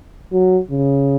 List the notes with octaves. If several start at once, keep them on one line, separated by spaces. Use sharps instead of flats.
F#3
C#3